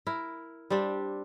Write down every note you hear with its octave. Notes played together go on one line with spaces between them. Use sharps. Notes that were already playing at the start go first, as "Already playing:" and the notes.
E4 A#4
G3 C4 D4 G4